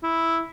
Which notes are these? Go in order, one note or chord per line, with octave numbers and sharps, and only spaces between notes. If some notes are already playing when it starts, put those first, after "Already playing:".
E4